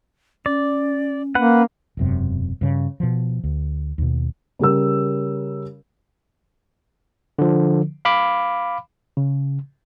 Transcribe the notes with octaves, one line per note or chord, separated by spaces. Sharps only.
C#4 D5
A#3 B4 F#5
E1 F#2 C3
G2 C#3
B2 F3
D2
D#2 B2
C#3 G3 A#4 E6
D3 F3
F5 B5 D6
C#3